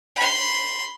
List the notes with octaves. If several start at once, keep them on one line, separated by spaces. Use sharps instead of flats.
B5 C6